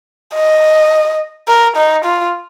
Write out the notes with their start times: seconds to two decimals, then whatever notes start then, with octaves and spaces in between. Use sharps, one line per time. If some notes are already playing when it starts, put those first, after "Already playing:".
0.34 D#5
1.48 A#4
1.77 D#4
2.05 F4